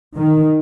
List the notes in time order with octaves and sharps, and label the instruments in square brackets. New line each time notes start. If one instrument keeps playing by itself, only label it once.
[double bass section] D#3